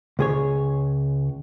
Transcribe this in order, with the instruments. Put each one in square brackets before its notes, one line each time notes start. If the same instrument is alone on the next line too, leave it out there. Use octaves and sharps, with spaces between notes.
[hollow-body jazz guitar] C#2 G#4 C#5